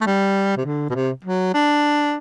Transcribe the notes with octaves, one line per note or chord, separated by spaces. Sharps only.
A3
G3
C3
D3
B2
C3
F#3
D4